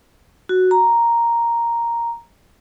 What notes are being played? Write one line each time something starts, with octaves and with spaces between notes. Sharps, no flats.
F#4
A#5